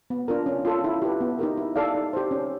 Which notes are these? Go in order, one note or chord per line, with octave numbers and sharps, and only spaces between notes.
B3
D4 F4 A#4
C#4
F4 A4
E4
G4 B4
B3
D#4 G4 A#4
E4
A4 D5 F5
D#4
G4 C5
C#4